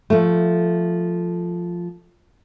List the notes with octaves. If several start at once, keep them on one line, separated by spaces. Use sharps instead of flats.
F3 A3